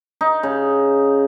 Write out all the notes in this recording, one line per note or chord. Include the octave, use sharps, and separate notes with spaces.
D#4
C#3